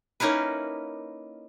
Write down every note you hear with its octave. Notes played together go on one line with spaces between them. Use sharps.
A#3 C#4 D#4 E4 B4